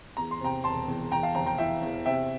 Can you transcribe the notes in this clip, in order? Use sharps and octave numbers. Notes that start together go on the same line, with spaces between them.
E2 A#5
C6
C3 G5 A#5
E1 A5 C6
E2
E2 G5 A#5
F5 A5
F1 G5 A#5
G5 A#5
E3 E5 G5
E2
C3 E5 G5